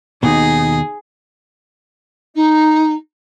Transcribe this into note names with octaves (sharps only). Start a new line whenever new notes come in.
D#2 B2 D#4 G#4
D#4